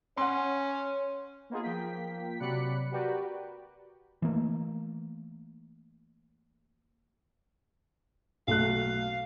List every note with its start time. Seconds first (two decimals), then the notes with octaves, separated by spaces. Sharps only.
0.17 C#4 C#5 F#5 C6
1.50 A#3 B3 D#4 F4 G#4
1.63 F3 A#3 G5 B6
2.40 C3 F#3 D5 B5 F#6 C#7
2.91 F#4 G4 A#4 B4 D5 G5
4.22 E3 A3 A#3
8.47 B1 A3 F5 F#6